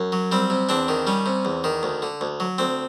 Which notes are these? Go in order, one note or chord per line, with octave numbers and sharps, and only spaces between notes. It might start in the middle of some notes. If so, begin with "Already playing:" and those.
Already playing: F#2
F#3
G3 C4
C3
E2 C4 D4
D#3
G3 C#4
C3
E2
D#3
D2
D3
D2
F#3
D2 C4